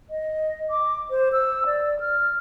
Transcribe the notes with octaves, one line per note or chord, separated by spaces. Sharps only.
D#5
D6
C5
E6
D5
F6